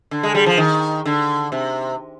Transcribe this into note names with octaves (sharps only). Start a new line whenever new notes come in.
D3
G#3
G3
F3
D#3
D3
C3